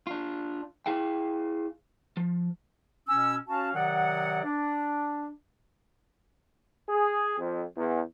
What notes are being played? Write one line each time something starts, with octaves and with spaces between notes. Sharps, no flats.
D4 F4
E4 G#4 F5 G5
F3
B2 C#4 E6
C#4 F#4 F5 A5
C3 D#3 F#3 D5 F#5
D4
G#4
F2
E2